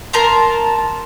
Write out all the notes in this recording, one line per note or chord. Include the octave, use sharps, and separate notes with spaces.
A#4 A5 A#5 C6